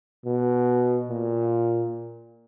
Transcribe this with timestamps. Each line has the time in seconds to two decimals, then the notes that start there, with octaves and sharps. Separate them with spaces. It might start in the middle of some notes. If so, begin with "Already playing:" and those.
0.25 B2
1.09 A#2